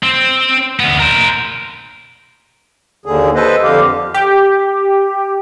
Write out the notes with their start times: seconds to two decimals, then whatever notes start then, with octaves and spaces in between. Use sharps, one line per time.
0.03 C4
0.80 D2 B3
1.00 A#4 C5
3.06 D#2 D3 G#4
3.35 A4 B4 C5 D#5
3.63 F2 D3 G4 F5
4.14 G4